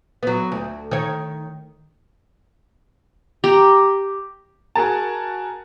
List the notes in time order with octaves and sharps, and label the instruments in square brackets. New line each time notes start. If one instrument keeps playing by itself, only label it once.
[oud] F#3 B3
D2
D#3 C#5
[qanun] G4 A#5
[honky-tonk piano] F#4 G#4 A#4 A5